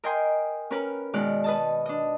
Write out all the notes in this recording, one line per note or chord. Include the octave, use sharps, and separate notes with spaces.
A#4 D#5 G5 G#5 C6
C#4 A#4 B4
B2 D#3 G#3 D5 F6 F#6
B4 D#5 A5
D4 D#5